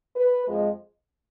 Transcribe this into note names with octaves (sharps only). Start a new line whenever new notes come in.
B4
F2 F3 G#3